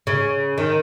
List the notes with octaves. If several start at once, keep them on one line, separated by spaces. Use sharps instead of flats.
C#3
D#3